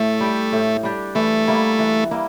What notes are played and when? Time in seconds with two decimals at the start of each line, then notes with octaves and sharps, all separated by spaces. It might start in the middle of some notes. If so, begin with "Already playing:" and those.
Already playing: A2 A3 A4
0.20 G3 D4 G4
0.53 A2
0.83 G3 D4 G4
1.15 E3 A3
1.48 G3 A#3 E4
1.79 E3
2.11 G3 A#3 E4